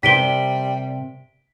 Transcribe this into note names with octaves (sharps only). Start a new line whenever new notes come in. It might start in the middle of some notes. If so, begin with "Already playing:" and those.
C3 G3 A#4 C5 B6 D7 G7